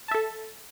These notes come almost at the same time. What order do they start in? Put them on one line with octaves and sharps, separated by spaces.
A5 E5 A4